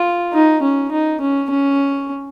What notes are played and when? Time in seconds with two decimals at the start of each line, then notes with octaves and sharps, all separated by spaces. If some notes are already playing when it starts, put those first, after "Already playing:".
Already playing: F4
0.33 D#4
0.62 C#4
0.92 D#4
1.21 C#4
1.50 C#4